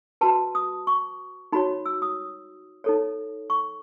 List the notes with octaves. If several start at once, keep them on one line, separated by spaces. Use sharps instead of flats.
F#4 B4 A5
D#6
C#6
D#4 F#4 C#5 B5
E6
D#6
D#4 A4 C#5
C#6